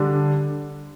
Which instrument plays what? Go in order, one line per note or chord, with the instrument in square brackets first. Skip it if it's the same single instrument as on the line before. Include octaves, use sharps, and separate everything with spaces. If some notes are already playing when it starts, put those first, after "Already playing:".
Already playing: [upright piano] D3 G3 D4